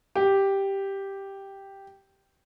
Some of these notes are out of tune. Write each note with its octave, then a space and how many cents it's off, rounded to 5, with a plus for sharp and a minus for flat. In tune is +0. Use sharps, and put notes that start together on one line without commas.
G4 +0